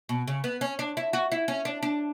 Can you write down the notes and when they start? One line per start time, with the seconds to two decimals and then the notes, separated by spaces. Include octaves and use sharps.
0.09 B2
0.28 C#3
0.44 B3
0.61 C#4
0.79 D4
0.97 E4
1.13 F#4
1.32 E4
1.48 C#4
1.65 D4
1.83 D4